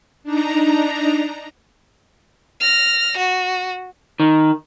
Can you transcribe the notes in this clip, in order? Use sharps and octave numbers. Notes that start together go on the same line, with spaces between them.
D4 D#4 A#5
F6 A#6
F#4
D#3